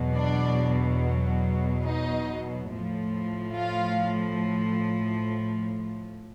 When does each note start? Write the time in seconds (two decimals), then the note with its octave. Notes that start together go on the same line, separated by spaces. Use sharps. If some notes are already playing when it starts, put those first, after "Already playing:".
Already playing: E2 B2 F#3
0.15 D4 D5
1.85 D#4 D#5
2.70 A2 F3
3.54 F4 F5